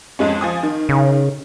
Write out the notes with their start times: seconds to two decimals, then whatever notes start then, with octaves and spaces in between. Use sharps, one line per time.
0.19 F2 G#3 C#4
0.41 F3 G#5 D#6
0.63 D#3
0.89 C#3